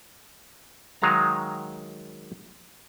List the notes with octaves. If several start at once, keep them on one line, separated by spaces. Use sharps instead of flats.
D#3 F#3 G#3 F5 A#5